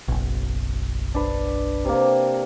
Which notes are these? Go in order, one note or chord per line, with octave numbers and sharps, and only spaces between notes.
F#1 B1
D4 B4
C3 A#3